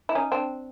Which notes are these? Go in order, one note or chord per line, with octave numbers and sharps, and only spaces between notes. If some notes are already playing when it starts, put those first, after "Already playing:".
E4
C#4 D#4
C4 D4